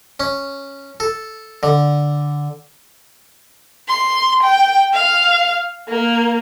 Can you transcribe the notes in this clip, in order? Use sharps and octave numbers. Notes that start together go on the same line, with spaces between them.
C#4
A4
D3
C6
G5
F5
A#3